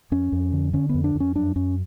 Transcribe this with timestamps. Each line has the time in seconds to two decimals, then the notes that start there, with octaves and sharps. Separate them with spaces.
0.11 F2 C#4
0.32 F2
0.53 D3
0.73 D3 C#4
0.89 B3
0.94 F2
1.04 D4
1.15 F2
1.20 C#4
1.35 F#2 D4
1.56 F#2 C#4